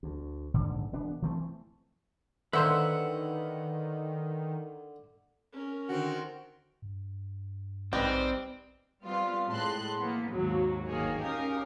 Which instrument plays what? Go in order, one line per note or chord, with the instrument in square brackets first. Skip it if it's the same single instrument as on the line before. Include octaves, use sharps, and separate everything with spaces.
[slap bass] D2
D#1 A#1 G#2 D3
E1 B3 D4
E3 A3 C4
[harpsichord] D3 [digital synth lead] D#3 [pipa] A#3 C5 E5 [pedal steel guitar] B4 F#5 E6
[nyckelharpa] C#4 A#4
[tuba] D3 [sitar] D#3 C4 [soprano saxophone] F#4
[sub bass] G2
[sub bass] A#1 [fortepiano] G#2 B4 D#5 [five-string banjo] G3 [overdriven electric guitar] C4
[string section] G3 B3 C4 F4 F5
A2 G#3 A5 C6 F#6
E3 A#3 B3
D#2 G#2 F#3 A#3
G1 D#3 A#3 G#4 C#5
C#4 D#4 G4 A#4 F5